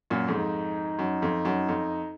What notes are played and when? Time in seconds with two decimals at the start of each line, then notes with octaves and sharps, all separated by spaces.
0.10 F#2 A#2
0.28 F2 G#2 D#4
0.99 F#2
1.22 F2
1.45 F#2
1.68 F2